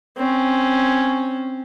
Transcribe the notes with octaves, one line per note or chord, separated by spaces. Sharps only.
C4 C#4